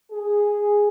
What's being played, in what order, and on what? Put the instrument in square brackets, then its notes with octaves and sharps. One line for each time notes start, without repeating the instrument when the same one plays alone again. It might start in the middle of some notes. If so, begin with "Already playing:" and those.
[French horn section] G#4